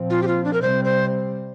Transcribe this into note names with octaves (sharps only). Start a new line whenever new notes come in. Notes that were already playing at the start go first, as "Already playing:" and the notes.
Already playing: A#2 F3 C4
F4
G4
F4
D4
A#4
C3 G3 C4 C5
C5